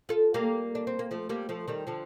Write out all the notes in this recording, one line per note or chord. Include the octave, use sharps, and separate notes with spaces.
F4 A4
G3 A#3
D4
C4
A#3
F3 A3
G3 A#3
F3 A3
D#3 G3
D3 F3